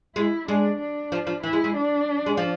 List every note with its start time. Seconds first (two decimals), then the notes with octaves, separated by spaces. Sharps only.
0.16 G#3 E4
0.48 G#3 D4
0.79 D4
1.12 F3
1.27 F3
1.43 E3 E4
1.53 G#3
1.64 G#3
1.75 D4
2.26 G#3
2.37 F3